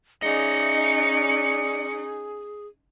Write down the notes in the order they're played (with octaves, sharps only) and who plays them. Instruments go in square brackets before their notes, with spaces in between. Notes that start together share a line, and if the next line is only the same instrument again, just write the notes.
[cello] C#4 D#4 [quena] G#4 [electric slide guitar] D5 D#5 [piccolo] C#7